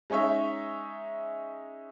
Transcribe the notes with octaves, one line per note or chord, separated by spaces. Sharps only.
G#3 C#4 D#4 C#5 E5